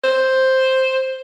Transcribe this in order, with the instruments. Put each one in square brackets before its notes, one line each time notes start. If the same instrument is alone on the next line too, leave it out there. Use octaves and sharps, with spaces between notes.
[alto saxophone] C5